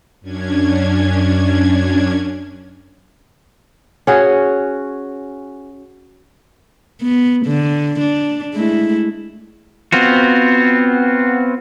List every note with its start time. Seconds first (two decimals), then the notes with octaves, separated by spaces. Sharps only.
0.21 F#2 C#4 D4 G#6
4.07 C#4 F#4 G#4
7.02 B3
7.46 D3
8.00 D4
8.53 G#3 A3 E4
9.92 B3 C4 F4 F#4